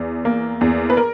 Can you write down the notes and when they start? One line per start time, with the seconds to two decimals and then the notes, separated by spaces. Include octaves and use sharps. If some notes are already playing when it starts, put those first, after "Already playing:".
Already playing: E2
0.25 A#3
0.61 E2
0.90 B4
0.97 A#4